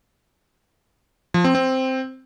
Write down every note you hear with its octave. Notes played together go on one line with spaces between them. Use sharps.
F3
C4
C4